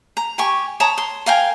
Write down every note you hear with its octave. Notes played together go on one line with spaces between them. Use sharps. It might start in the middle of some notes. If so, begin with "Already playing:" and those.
A#5
G4 G#5 C#6
C#5 A5 A#5 D#6
C6
A#4 F5 G5 G#5